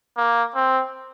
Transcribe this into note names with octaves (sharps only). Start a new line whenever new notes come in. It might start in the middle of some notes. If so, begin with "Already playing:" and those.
A#3
C4